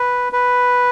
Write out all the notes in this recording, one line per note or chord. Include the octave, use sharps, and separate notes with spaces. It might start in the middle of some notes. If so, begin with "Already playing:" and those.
Already playing: B4
B4